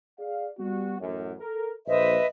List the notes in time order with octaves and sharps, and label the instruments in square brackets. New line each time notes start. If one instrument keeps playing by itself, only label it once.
[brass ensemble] G#4 D5 F5
G3 B3 F#4
A1 F#2
A4 A#4
[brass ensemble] A#1 C5 [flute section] B4 D#5 E5